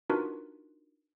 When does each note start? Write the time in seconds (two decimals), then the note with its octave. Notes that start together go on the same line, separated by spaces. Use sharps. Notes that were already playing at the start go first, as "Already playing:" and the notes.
0.10 D4 D#4 F4 F#4 A#4 B4